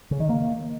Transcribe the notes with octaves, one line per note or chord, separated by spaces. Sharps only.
C#3
D#3
A#3